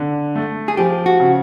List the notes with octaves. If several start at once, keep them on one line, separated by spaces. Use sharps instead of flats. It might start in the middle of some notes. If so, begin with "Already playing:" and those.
Already playing: D3
A3
G#4
F3 G4
F#4
C#3